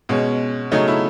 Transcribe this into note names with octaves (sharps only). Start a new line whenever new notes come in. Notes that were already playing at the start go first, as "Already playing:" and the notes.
B2 G#3 C#4
C#3 F#3 A3 C#4 D#4
E4